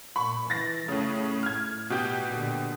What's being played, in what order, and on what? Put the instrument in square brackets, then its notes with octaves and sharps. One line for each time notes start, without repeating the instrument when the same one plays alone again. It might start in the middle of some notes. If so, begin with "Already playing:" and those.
[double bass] A#2 [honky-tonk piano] B5 C#6
[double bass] E3 [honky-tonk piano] A6 A#6
[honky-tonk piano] A2 C#3 [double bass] A3
[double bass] A2 [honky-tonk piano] F6 G#6
[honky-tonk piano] B2 G4 G6
[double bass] A#2 D3